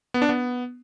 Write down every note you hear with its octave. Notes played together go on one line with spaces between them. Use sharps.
B3
D4
B3